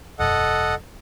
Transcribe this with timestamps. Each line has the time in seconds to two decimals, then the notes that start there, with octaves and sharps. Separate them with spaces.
0.19 E1 F#2 A4 D#5 F#5